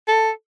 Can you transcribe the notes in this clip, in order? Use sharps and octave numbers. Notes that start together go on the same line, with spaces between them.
A4